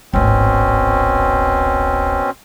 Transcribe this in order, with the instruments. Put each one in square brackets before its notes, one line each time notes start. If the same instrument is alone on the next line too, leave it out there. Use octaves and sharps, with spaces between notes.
[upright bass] D1 G#1 [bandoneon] B2 C4 C#4